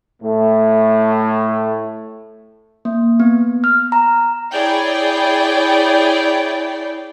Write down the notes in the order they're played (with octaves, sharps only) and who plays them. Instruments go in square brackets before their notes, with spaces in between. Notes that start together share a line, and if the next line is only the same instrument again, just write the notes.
[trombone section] A2 A3
[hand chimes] A#3
B3
F6
A#5
[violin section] E4 G#4 C#5 D5 G5